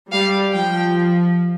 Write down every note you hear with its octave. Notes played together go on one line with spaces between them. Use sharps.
G3 F5
F3 G5